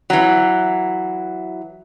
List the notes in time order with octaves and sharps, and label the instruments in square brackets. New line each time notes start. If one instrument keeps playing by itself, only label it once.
[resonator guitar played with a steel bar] E3 F#3